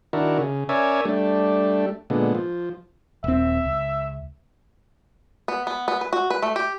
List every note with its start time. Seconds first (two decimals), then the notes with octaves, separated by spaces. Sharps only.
0.13 D#3 D4 E4 F#4 A#4
0.38 C#3
0.69 C#4 A#4 C#5 D5 E5 G#5
1.05 G3 A3 D4
2.10 A#2 D3 G#3 B3
2.35 F3
3.24 D#1 C4 E5
3.65 C#2
5.48 B3
5.67 B3
5.88 B3
6.01 B4
6.13 F#4
6.30 B4
6.43 A3
6.56 G4